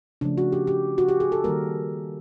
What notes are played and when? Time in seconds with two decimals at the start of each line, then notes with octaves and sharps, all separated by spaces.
0.21 C#3 F3 A3 D4
0.38 F#4
0.52 G4
0.67 G4
0.98 F#4
1.08 G4
1.20 G#4
1.32 A4
1.44 D#3 G3 A#3 A#4